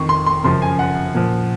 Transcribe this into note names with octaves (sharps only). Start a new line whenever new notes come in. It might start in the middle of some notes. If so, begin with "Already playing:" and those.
Already playing: F2 D#3 C#6
C6
C6
F#2 C#3 F3 C6
G#5
F#5
A#2 F3